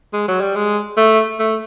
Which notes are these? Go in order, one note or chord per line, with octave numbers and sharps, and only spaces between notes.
G#3
F#3
G3
G#3
A3
A3